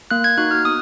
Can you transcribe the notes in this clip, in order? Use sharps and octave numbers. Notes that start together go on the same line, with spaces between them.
A#3 F#6
G#6
D#4 F#4 F#6
F6
B3 D#6